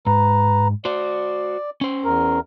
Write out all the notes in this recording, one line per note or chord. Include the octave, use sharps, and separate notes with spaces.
G#2 B4 A#5
F#4 C5 D5
C#4 C5
E2 A#4